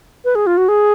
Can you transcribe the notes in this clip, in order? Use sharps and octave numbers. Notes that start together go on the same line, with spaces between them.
B4
G#4
F4
F#4
G#4